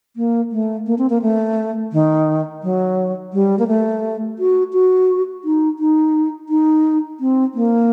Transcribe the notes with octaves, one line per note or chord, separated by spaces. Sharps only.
A#3
A3
A#3
C4
A#3
A3
D#3
F#3
G3
A#3
A3
F#4
F#4
D#4
D#4
D#4
C4
A#3